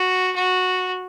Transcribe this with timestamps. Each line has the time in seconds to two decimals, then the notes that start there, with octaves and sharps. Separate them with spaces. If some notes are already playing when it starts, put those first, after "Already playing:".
Already playing: F#4
0.36 F#4